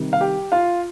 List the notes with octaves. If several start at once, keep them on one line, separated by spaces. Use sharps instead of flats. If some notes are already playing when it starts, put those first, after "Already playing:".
Already playing: C3 D#3 G3
F5
G4 G5
F4 F5